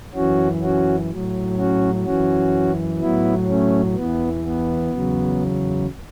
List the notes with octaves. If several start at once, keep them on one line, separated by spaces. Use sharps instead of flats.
F#2 E3 C#4 F#4
C#4 F#4
A2 F#3
C#4 F#4
F#2 E3 C#4 F#4
A2 F#3 B3 E4
A3 C#4
E2 E3 B3
B3
E2 C#3 F#3